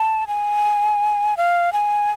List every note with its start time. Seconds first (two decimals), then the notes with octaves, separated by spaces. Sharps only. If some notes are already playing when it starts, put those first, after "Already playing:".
Already playing: A5
0.27 G#5
1.37 F5
1.73 G#5